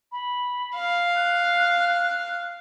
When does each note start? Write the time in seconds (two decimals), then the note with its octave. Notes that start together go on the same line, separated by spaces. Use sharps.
0.12 B5
0.76 F5
1.16 F#6